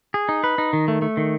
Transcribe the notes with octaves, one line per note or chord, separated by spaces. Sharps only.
G#4
D#4
B4
D#4
D#3
A3
A3
D#3